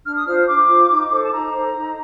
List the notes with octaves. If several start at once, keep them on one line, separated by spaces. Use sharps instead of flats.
D4 F6
D#6
F4 C5 F6
D4 D6
F4 C5
D#4
A4 C5
A5
D#4 A#5
A4 C5
D#4